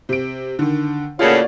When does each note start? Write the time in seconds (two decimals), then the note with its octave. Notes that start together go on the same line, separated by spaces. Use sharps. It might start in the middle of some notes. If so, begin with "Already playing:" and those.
0.09 C3 D7
0.59 D3 D#3
1.19 A2 C#3 A#3 F4 F#4 C#5 D5